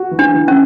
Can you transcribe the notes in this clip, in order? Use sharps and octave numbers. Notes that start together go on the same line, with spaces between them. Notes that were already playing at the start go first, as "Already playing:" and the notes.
Already playing: F#4
E3
D4
E3
C#4